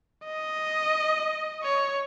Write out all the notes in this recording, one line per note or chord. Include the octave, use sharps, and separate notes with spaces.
D#5
C#5